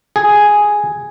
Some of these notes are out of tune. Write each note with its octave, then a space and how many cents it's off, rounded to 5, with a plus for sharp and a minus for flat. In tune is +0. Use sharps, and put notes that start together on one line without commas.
G#4 +0